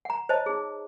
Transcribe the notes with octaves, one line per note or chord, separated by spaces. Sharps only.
F#5 A#5
C5 C#5 D#5 A5
D#4 G#4